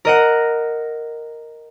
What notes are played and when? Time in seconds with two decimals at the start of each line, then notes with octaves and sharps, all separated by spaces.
0.05 A#4 D#5 F#5